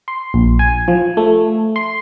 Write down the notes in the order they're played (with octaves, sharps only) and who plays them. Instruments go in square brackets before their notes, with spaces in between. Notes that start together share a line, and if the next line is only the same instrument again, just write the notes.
[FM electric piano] C6
A#1
G#5
F3
A3
C6